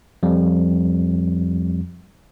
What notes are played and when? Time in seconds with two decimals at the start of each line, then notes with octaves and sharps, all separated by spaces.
0.23 F2 F3 G3